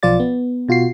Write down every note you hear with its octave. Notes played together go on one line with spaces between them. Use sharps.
B1 F3 F4 D5 A6
B3
B2 F4 F#4 C7